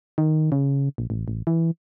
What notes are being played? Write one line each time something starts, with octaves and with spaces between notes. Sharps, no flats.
D#3
C#3
A#1
A1
A1
E3